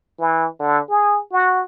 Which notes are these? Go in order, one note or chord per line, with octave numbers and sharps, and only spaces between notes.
E3
D3
G#4
F#4